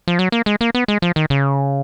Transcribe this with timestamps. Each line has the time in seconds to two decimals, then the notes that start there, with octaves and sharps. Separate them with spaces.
0.08 F3
0.19 F#3
0.32 A#3
0.46 G#3
0.61 A#3
0.75 B3
0.88 G#3
1.02 F3
1.16 D#3
1.30 C#3